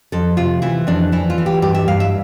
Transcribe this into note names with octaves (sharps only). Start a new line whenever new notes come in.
F2 A4
C3 F4
E3 E4
F2 D4
E3 E4
F4
E3
G4
G2 G4
E5
G2 F5
E5